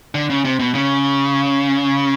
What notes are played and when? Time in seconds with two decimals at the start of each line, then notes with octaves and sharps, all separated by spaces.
0.15 D3
0.30 C#3
0.45 C3
0.59 B2
0.75 C#3